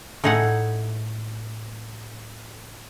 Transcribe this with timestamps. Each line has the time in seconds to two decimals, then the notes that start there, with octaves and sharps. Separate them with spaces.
0.24 A2 D#4 G#4 E5 F#5